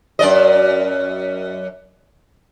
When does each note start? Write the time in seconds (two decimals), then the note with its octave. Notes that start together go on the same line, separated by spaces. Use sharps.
0.19 F#2 D5 D#5